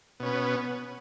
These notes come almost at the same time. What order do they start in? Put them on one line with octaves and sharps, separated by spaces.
B2 C#4 B3